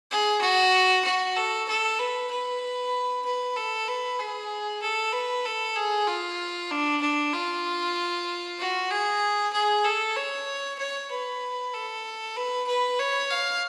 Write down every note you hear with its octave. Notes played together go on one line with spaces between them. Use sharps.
G#4
F#4
F#4
A4
A4
B4
B4
B4
A4
B4
G#4
A4
B4
A4
G#4
F4
D4
D4
F4
F#4
G#4
G#4
A4
C#5
C#5
B4
A4
B4
B4
C#5
F5